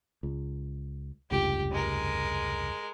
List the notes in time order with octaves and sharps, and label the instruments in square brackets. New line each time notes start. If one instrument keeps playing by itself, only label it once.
[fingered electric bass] C#2
[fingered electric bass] F1 C#2 G2 [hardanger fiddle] G4
[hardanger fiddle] G#3 A#4